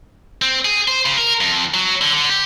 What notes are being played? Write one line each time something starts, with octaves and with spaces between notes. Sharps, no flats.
C4
G#4
C5
C#3
A#4
F2
F#3
D3
D3
G4